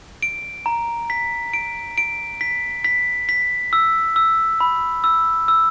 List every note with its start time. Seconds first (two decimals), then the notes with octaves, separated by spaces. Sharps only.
0.23 D7
0.66 A#5
1.10 B6
1.54 D7
1.98 D7
2.41 B6
2.84 B6
3.29 B6
3.73 E6
4.16 E6
4.60 B5
5.04 E6
5.48 E6